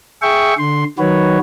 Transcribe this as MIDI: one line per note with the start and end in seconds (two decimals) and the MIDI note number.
0.22 0.54 68
0.22 0.54 76
0.22 0.54 79
0.22 0.54 85
0.59 0.84 50
0.59 0.84 84
0.99 1.39 51
0.99 1.39 54
0.99 1.39 66
0.99 1.39 71
0.99 1.39 73